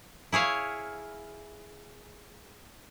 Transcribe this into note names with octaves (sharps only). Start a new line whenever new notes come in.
E4 G#4 C#5 F5